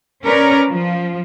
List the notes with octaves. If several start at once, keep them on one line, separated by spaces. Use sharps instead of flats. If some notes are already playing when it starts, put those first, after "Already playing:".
C#4 A#4 B4 C#5 D5
F3